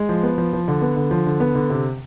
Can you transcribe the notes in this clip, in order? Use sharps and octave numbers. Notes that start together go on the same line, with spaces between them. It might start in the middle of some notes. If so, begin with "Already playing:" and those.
Already playing: G#3
F3
B3
F3
F3
D3
B3
D3
F3
D3
B3
D3
C3